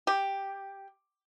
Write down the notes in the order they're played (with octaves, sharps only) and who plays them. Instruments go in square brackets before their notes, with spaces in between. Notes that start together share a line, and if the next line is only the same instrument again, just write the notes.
[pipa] G4